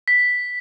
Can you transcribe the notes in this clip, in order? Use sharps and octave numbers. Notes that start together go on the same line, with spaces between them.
B6